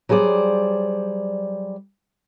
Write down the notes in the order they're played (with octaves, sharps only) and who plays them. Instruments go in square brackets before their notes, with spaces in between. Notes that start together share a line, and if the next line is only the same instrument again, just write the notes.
[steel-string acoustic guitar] F#3 G3 G#4 C5 D5